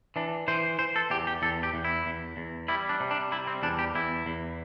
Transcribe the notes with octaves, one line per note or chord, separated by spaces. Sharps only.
E3 D4
E3 C5
E3 C5
A4
E2 G4
G4
E2 A4
G4
E2
E4
E2
E2
G3 E4
D4
C3
D4
G3 E4
C4
E2 D4
G4
E2 E4
E2